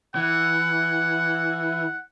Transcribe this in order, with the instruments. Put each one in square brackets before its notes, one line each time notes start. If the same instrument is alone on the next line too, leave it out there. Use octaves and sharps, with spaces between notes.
[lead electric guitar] E3 [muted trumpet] F#5